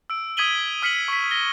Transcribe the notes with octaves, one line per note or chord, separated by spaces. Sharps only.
E6 D7
D#6 G#6 B6 D#7 F#7 G7
D#6 F6 B6 C#7 D#7 F#7
C#6 B6
A#6 G7